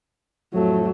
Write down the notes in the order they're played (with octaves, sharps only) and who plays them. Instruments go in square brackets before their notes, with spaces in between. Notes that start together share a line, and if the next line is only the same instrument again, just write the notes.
[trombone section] F2 A2 A3 [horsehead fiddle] F#3